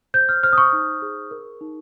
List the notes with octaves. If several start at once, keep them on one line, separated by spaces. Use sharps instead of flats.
C5 G6
F6
C5 F6
D#6
C#6
D#4
G#4
A#4
D#4